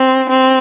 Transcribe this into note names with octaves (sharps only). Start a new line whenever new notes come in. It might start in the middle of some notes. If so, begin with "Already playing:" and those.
Already playing: C4
C4